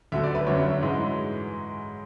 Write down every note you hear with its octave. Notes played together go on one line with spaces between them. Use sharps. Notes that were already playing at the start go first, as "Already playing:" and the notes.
D2 D3 F#3 A3 E5
D5
B4
F#2 D3 F#3 A3 C#5
G#2 E3 G#3